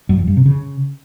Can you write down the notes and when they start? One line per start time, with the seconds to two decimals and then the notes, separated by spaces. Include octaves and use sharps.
0.09 F#2
0.18 F2
0.27 G2
0.36 C3
0.46 C#3